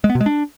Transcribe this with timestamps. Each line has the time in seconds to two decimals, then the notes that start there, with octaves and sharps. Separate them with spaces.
0.04 G#3
0.10 B3
0.15 B2
0.21 G#3
0.26 D4